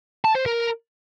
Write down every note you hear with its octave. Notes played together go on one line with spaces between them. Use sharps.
A5
C5
A#4